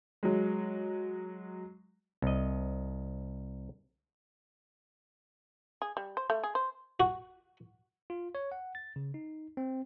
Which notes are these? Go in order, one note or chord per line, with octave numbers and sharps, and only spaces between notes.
F#3 G#3
C2 D#5
G#4
G3
C5
A3
G#4
C5
F#4
F4
C#5
F#5
A6
C#3
D#4
C4